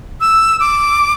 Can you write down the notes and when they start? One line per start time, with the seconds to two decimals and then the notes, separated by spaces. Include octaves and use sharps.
0.20 E6
0.60 D6